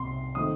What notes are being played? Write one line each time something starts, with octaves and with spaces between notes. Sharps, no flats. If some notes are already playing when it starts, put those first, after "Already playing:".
Already playing: C2 C3 C6
D#3 A3 C4 D#6